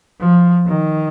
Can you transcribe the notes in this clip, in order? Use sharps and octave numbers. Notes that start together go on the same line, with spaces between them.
F3
D#3